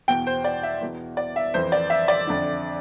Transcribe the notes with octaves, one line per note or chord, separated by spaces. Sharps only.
E2 B2 G5
C5
D5
E5
E2 B2
D5
E5
F2 E3 C5
D5
E5
D5
F2 D3